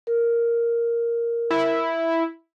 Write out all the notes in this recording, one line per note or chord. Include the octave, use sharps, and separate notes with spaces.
A#4
E4